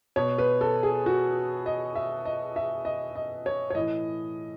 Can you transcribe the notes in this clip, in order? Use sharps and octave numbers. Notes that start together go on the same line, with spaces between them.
B2 C#5
B4
A4
G#4
F#4
D#5
E5
D#5
E5
D#5
D#5
C#5
C#5
A2 E3 D#5